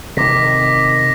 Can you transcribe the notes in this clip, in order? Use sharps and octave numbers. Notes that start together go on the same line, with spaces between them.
C3 D#3 D6 A#6 B6